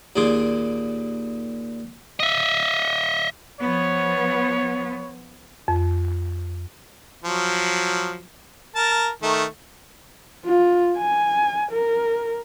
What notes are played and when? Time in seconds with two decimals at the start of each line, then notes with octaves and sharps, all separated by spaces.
0.16 D#2 A#2 G#4 D5 C6
2.20 D#5 E5
3.60 F3 B3 C#5
5.68 F2
7.24 F3 F#3
8.75 A#4 A5
9.22 D#3 A3
10.45 F4
10.98 G#5
11.72 A#4